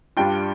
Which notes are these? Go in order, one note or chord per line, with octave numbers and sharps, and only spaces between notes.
G2 G3 D4 F4 G5